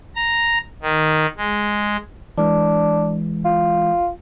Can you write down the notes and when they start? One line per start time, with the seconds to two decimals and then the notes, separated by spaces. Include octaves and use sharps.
0.16 A#5
0.82 D#3
1.37 G#3
2.38 E3 G#3 D4
3.45 F4